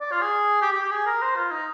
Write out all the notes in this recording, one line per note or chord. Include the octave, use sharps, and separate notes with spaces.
D5
F4
G#4
G4
G4
G4
G#4
A#4
C5
F4
D#4